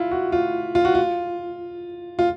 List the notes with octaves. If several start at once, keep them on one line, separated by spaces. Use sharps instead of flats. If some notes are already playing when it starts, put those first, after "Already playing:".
Already playing: E4 F4
F#4
F4
F4
F#4
F4
F4